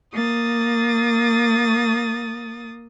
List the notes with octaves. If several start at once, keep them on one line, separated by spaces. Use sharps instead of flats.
A#3 D#6 A6